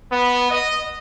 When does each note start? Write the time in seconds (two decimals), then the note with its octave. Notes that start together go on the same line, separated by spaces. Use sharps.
0.11 B3
0.50 D#5